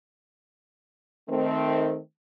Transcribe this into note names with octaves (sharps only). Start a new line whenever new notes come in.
D#3 A3 C4